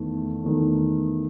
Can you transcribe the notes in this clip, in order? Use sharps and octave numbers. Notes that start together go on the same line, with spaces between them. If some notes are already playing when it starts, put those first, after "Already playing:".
Already playing: E2 D#3 A3
E2 D#3 A3